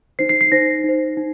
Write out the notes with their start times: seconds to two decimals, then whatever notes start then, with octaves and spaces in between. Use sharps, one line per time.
0.19 D#4 C5 C7
0.29 C7
0.41 C7
0.52 D#4 C5 A#6
0.84 D#4 C5
1.17 D#4